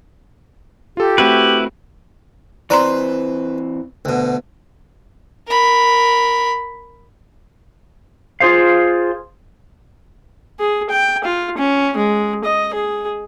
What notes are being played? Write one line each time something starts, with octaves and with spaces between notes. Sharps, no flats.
F4 G4 A4
A3 C4 E4 F#4 B4
E3 C4 B4 C5 D5 A#5 C6
D2 B2
A#4 B5
F4 G#4 C5 F5
G#4
G5
F4
C#4
G#3
D#5
G#4